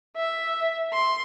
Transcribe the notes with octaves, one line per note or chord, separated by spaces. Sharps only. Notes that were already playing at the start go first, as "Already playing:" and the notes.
E5
C6